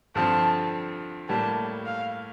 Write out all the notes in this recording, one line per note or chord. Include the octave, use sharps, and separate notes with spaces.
G2 D3 F3 C4 A5
A2 G3 A#3 A5
F5